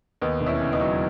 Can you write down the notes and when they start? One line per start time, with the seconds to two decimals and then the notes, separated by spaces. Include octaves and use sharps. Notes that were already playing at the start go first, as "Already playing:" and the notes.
0.22 D#2 B3 D#4
0.41 E1
0.46 C#4 E4
0.60 C#3
0.72 B3 D#4
0.80 F#3